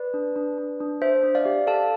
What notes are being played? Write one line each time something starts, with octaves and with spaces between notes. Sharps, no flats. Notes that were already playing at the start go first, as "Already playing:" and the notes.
Already playing: B4 D5
D4
D4
D4
D4
D4 C5 E5
D4
D5 F5
G4
A4 F5 A5